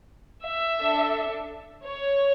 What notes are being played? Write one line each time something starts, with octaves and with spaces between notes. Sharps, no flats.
E5
D4 A4
C#5